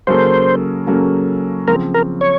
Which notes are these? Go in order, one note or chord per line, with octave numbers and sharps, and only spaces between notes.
C#3 F#3 A#3 C#4 A4 C5
C#3 F#3 A#3 C#4 A4
C#3 F3 C4 A#4
A#4
C#5